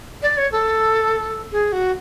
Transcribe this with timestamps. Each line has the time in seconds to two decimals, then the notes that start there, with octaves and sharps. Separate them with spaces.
0.23 D5
0.38 C#5
0.52 A4
1.52 G#4
1.72 F#4